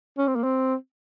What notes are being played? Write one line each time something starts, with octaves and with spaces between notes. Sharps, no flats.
C#4
C4
A#3
C4